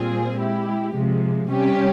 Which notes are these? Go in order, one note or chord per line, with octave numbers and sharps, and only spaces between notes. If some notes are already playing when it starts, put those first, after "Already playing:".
Already playing: A#2 G3 C4 F4 G#4
G#3 E4 G4
C3 F3 G#3
C3 G3 C#4 G4